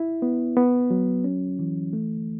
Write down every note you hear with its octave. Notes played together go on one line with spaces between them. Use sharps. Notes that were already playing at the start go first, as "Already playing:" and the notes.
Already playing: E4
B3
B3
F#3
C#4
E3
A3